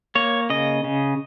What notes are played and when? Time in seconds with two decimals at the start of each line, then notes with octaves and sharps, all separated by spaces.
0.15 A#3 C#5
0.50 C#3 D#5
0.84 C#3